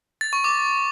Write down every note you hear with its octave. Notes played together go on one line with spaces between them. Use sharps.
A6
C#6
D6